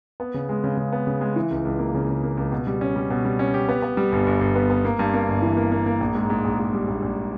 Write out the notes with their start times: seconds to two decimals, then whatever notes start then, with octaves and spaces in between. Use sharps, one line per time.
0.20 B3
0.34 C#3
0.49 G#3
0.64 C#3
0.77 C#3
0.92 B3
1.07 C#3
1.21 G#3
1.36 E3
1.51 C#2
1.65 C#2
1.79 A#3
1.94 C#3
2.09 C#3
2.23 A#3
2.37 C#2
2.52 B2
2.67 G3
2.81 C#4
2.96 G3
3.10 B2
3.25 G3
3.39 C#4
3.54 G4
3.69 B3
3.82 B3
3.97 G3
4.12 G1
4.26 G1
4.41 G1
4.55 B3
4.70 B3
4.85 A#3
4.99 G2
5.14 A#3
5.28 G1
5.42 E3
5.57 A#3
5.72 A#3
5.86 A#3
6.01 A#1
6.15 G#2
6.30 G#2
6.44 A#1
6.59 G#2
6.73 G3
6.88 A#1
7.02 A#1